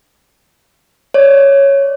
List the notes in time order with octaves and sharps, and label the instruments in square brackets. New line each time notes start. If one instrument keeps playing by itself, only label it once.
[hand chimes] C#5 D5